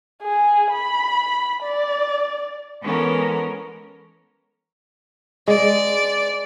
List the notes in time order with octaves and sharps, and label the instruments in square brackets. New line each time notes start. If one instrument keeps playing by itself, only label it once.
[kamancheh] G#4
B5
D5
[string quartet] E3 G#3 B3 C#4 A4 A#4
[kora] G#3 [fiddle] D5